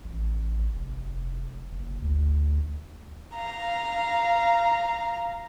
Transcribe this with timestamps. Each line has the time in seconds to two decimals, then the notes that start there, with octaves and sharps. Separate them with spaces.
0.04 A1
0.75 F1
1.72 F#1
2.02 D2
3.34 F5 A#5